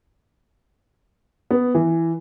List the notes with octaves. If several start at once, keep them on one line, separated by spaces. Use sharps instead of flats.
B3
E3